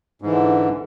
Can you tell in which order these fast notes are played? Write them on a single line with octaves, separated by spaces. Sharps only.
G#2 E3 D3